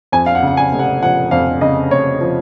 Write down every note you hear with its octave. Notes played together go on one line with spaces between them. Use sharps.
F2 G#5
F5
F#5
C#3
F#5
G#5
F1
F#5
F3 F#5
F2 F5
C#3 D#5
F1 C#5
F3